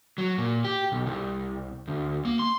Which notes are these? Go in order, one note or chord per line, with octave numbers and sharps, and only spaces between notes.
F#3
A#2
G4
B1
C2
D2
A#3
C6